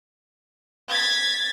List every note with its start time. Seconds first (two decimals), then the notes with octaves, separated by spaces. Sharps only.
0.90 G#6 A6 B6